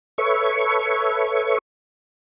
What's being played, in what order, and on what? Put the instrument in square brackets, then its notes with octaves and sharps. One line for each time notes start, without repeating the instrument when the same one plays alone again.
[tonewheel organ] A4 B4 C#5 E5 C#6